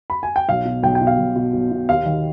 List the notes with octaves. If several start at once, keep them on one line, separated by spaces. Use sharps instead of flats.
B5
G#5
G5
B1 F5
B2
B1 G5
G5
B2
F5
B1
B2
B1
B2
D#2 F5
D#3